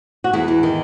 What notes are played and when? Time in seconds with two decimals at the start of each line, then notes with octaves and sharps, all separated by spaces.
0.24 F#4
0.33 E2 E4 G#4
0.48 E2
0.63 D#3